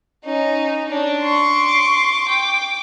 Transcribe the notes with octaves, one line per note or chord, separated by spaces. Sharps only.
C#4 D#4
D4 C#5
C6 C#6
D6
G5